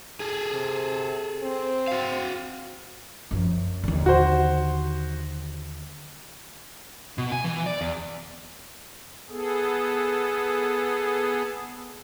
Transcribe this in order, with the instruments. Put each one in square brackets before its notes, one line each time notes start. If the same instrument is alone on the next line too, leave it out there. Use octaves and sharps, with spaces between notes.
[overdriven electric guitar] G#4 A4
[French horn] C3
C4
[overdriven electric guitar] F#4 F5
[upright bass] F#2 F3
D#2 D3
[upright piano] F#4 C5
[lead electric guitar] B2
G#5
E3
D5
E2
[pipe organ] B3 G#4 A4